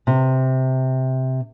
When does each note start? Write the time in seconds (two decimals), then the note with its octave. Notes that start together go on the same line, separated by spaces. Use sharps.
0.07 C3